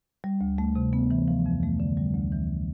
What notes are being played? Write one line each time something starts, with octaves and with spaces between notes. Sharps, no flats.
G3
D2
A3
C3
B3
E3
F3
F2
A3
D3
G3
D2
E3